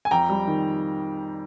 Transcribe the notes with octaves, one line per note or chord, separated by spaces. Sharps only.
G#5
F2 G5 A#5
G3
D#3